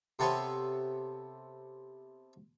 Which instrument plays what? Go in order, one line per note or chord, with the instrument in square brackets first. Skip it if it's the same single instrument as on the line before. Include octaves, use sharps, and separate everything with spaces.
[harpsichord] C3 B3 A4 B4 C#5 C6